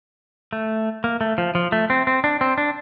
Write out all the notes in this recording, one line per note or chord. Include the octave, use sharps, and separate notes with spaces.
A3
A#3
A3
F3
F3
A3
C4
C4
D4
C4
D4